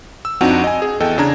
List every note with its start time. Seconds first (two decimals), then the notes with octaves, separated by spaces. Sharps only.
0.25 E6
0.41 F2 C4 D4 D#4 F#4 F#5
0.64 D#5 G#5
0.82 G#4
1.00 E2 A4 D#5 G5
1.18 C#3 D4 A#5 G#6